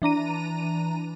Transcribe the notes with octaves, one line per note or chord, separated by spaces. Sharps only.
E3 D4 A#5 D#7